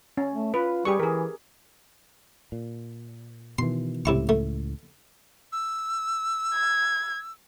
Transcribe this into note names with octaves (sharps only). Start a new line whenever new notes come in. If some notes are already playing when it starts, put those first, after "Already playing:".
C#4
A3
F4 B4
G3 G4 G#4 C#6
E3 G#4 A#4
A#2
B2 D#3 E3 C6
C#2 A2 C3 E4 C#6
A3
E6
G#6